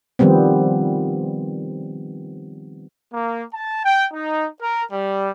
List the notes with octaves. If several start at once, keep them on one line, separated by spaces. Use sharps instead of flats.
D#3 F3 G3 B3 C4
A#3
A5
G5
D#4
A#4
G3